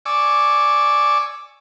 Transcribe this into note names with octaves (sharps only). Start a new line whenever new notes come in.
D5 G#5 C#6 D6 E6